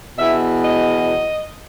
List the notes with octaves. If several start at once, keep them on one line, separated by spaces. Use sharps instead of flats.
E2 B2 E5
D#5